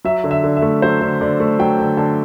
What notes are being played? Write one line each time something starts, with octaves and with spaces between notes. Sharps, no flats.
F#3 E5
D3
E5
D3
E5
A3
F#3 C5
D3
D3 D5
A3
F#3 G5
D3
D3 A5